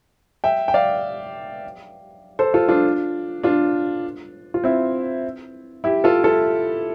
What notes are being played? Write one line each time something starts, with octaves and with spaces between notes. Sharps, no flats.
E5 G5
G5
D5 F5
A4 C5
F4 A4
D4 F4
D4 F4
F4
C4 E4
E4 G4
F4 A4
F4 A4